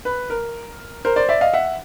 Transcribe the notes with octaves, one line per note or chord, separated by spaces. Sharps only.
B4
A#4
A#4 C5
C5 D5
D5 E5
D#5 F5
E5 F#5